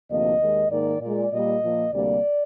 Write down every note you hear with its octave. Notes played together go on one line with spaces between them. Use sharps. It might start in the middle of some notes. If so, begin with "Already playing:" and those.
D2 C3 F3 A#3 D#5
D#2 D#3 G#3
G#2 D#3 A#3 D5
A#2 G#3 D5
A#2 G3 A#3 D#5
A#2 F3 A#3
D2 C3 G3 A#3 D5